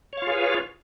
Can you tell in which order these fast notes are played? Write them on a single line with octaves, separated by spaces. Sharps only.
C#5 F5 F4 G#4 B4